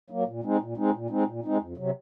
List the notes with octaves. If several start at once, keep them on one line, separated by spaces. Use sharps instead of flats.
F#3 A#3
A#2
G#3 C4 D#4
A#2
G#3 C4 D#4
A#2
G#3 C4 D#4
A#2
G#3 C4 D#4
F2
C3 F#3